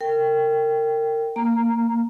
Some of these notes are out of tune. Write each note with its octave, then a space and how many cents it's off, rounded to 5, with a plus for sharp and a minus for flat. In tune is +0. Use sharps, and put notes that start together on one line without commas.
A#4 -30 G5 -5
A#3 -20 A#5 +0